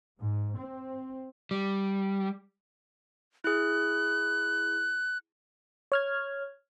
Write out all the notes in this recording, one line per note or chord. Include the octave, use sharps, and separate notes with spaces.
G#2
C4
G3
E4 G#4 F#6
C#5 F6 G#6